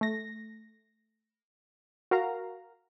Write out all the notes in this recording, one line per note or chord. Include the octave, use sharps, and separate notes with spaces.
A3 A#6
F#4 A#4 F5 A#5